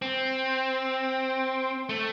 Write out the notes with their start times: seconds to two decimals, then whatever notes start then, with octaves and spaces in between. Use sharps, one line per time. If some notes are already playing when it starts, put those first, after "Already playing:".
0.02 C4
1.89 A3